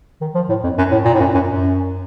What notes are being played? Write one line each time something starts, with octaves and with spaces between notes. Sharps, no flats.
D#3
F3
A2
F2
F#2
A2
A#2
A2
F#2
F#2
F#2